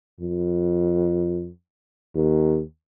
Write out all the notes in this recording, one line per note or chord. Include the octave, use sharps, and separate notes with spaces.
F2
D#2